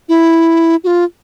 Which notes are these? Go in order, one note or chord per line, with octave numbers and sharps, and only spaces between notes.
E4
F#4
F4